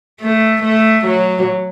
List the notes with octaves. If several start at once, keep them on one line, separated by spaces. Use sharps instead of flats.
A3
A3
F#3